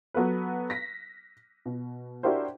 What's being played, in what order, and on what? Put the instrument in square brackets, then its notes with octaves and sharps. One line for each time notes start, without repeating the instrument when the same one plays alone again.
[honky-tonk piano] F#3 B3 A4 B4
A#6 B6
B2
D4 E4 F#4 G4 A#4 C5